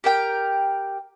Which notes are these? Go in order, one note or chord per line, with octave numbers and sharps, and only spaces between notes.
G4 A#4 G5